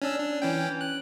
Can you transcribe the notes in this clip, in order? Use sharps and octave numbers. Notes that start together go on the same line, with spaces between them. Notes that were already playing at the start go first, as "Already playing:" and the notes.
C#4 D4 E6
D4
E3 C#4 G5
F#6